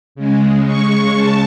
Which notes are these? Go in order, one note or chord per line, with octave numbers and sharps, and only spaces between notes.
C#3 G#3
C#6
C#3 A5